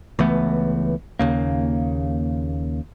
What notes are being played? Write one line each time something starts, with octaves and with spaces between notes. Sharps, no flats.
C#2 E3 A3 B3
D#2 C#3 A#3